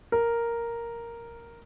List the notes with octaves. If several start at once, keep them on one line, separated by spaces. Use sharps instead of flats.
A#4